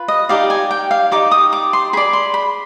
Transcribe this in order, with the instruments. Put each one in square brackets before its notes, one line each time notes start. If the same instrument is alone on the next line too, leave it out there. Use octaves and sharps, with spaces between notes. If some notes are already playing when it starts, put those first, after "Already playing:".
Already playing: [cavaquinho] F4 B4
D#5
D#4 G4 D5 F5
G#5
G5
F5
D#4 G4 D5 D6
D#6
D6
C6
G#4 D5 B5
C6
B5